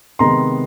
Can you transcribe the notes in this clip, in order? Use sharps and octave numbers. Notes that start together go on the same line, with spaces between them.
C3 D#3 G#3 B3 A#5 C6